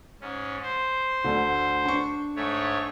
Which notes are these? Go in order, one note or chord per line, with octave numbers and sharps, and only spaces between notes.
G#2 C#4
C5
D2 D3
D4 C#6
G#2 A3 C#5